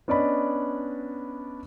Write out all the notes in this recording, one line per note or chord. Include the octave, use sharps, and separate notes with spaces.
B3 C#4 D4 D5 D#5 B5